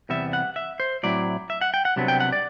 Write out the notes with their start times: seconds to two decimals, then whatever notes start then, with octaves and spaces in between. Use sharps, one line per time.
0.09 E2 C3 G3 B3 E5
0.33 F#5
0.56 E5
0.80 C5
1.03 A2 F#3 C4 E4 D5
1.50 E5
1.61 F#5
1.74 G5
1.85 F#5
1.96 C2 C3 F#3 B3 D4
2.08 G5
2.20 F#5
2.32 D5